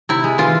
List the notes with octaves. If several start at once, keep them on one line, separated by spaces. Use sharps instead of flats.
C3 E4
G#3
E3 F4